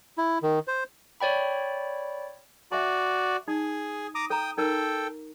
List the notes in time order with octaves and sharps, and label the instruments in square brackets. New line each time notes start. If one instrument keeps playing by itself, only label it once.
[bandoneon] E4
D#3
C5
[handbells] C#5 D5 G5 B5
[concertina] F#4 D5 [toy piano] E5 G#5
[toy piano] D#4 [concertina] G#4
[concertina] A#5 D6 D#6
[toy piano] A4 A#5 [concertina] G5 D#6
[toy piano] D#4 A#4 [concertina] A4 G5